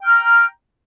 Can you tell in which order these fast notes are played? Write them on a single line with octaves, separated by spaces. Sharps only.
G5 F6 A#5